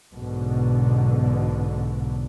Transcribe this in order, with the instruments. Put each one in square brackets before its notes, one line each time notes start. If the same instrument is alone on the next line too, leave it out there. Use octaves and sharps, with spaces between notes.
[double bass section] B1 G#2 B2 D3